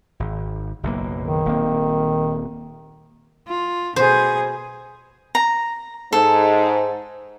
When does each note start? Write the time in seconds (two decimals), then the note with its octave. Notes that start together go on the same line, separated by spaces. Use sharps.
0.20 G#1
0.83 F#1 B1 A#3
1.21 D#3
1.45 D#1 A#3 C4
3.48 F4
3.96 B2 G#4 C5
5.35 A#5
6.13 G#2 A4